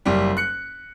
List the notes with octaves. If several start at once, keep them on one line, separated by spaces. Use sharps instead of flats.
F#1 G3
F#6 C#7